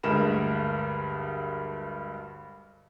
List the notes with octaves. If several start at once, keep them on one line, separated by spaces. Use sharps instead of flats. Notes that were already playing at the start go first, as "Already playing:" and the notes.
D2 G2 G#3 A#4 B5 E7